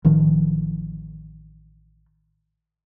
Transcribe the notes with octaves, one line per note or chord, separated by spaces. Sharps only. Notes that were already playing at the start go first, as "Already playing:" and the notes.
A1 D#3 F3